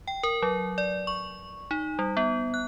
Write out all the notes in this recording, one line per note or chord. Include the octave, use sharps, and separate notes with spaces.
G5
A#4
F#3
D5
C#6
D#4
G3
B3
F#6